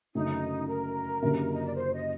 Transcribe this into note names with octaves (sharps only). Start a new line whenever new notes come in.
F#1 F#2 D3 A3 D#4
A#4
F#1 F#2 D3 G3 A#3
D#5
D5
C5
D#5